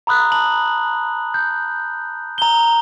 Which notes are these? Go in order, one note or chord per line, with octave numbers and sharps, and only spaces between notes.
A#5 B5 D#6 F#6
A5 F#7
G6
A#5 G7